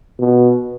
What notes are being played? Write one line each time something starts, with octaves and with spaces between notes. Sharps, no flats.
B2